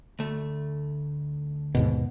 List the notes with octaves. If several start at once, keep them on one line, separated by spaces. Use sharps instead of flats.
D2 A3
D#2 G#2 B2